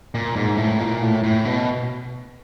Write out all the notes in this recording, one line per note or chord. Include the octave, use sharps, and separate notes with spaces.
A#2
G#2
A2
A#2
A2
A2
B2